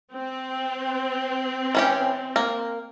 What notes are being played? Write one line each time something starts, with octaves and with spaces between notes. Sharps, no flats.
C4
E3 C#4 G4
A#3